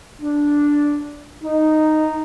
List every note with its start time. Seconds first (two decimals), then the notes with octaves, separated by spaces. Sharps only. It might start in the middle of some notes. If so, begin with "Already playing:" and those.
0.21 D4
1.43 D#4